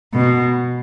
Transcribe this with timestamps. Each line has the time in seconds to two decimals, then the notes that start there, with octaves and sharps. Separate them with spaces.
0.13 B2